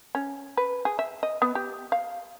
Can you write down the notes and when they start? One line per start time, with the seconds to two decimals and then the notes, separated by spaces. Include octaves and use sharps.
0.15 C#4
0.57 B4
0.85 G#4
0.99 E5
1.23 D#5
1.42 B3
1.55 G4
1.92 F5